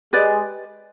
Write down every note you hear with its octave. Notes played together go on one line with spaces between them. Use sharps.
G#3 G4 B4 D5